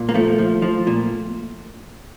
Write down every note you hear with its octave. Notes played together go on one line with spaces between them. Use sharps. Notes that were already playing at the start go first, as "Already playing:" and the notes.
Already playing: A#2
A#3
F3 A3
F3
F3
A#2